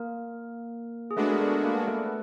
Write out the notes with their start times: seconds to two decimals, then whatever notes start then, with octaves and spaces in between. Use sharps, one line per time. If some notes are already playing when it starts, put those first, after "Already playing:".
Already playing: A#3 A#4
1.11 G#4
1.17 G#3 A3 B3 D4 F#4 A4
1.31 A#4
1.41 A3 A4
1.64 A#3 A#4
1.87 A3 A4
2.06 B4